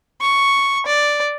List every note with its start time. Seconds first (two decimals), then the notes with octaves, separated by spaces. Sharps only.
0.21 C#6
0.87 D5